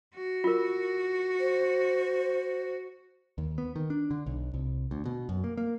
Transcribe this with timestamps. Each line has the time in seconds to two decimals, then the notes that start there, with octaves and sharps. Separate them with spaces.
0.14 F#4
0.44 F4 A#4
1.40 C5
3.38 D#2
3.58 B3
3.76 D#3
3.90 D4
4.11 D3
4.26 B1
4.54 C2
4.91 D2
5.06 B2
5.29 F#2
5.44 A#3
5.57 A#3